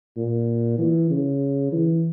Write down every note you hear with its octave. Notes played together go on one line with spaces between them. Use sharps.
A#2
E3
C#3
E3